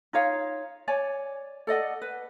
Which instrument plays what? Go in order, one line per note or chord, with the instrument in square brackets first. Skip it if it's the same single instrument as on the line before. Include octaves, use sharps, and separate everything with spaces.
[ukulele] D#4 F4 C#5 F5
C#5 D5 G#5
A4 D5 D#5 F#5
B4